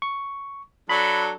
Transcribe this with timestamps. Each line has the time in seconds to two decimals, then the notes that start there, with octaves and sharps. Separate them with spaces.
0.02 C#6
0.89 F#3 D4 A4 B5